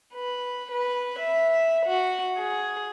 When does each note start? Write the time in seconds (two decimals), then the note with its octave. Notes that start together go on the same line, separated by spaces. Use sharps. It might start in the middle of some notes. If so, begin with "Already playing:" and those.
0.13 B4
0.70 B4
1.19 E5
1.84 F#4
2.36 G#4